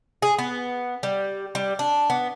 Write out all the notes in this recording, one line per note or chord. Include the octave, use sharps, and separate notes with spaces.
G#4
B3
G3
G3
D4
B3